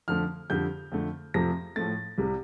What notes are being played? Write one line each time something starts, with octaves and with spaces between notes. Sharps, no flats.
F2 D3 F3 A3 F6
F2 D3 G3 G6
F2 D3 A3
F2 C3 F3 A3 A#6
A2 F3 A3 A6
C2 C3 G3